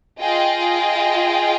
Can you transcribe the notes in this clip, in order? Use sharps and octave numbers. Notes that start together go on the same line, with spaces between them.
F4 G#4 D#5 G5